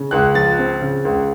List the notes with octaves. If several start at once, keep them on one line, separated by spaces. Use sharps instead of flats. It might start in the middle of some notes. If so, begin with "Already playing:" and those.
Already playing: C#3
C#2 F#6
F3 A6
C4
C#3
C#2